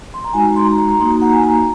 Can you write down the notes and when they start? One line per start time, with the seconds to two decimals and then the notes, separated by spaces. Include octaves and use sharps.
0.14 C6
0.24 A#5
0.33 G#3 D#4 F#4 G#5
0.45 A#5
0.56 C6
0.67 A#5
0.79 A#5
0.89 A#5
1.00 A#3 D#4 F#4 C6
1.11 A#5
1.22 F#5
1.33 G#5
1.44 A#5
1.54 A#5